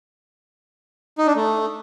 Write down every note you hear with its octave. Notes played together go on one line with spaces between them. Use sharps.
D#4
D4
A3